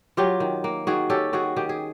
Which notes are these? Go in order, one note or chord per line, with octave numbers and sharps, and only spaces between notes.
F#3 F4 G4
D#3
A#3
D#3 F#4 G#4
C#4 G4 A4
D#3 F#4 G#4
D#3 G4
G#4